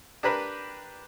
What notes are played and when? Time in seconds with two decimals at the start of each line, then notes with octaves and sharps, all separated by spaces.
0.23 D4 G4 A#4 B4 B5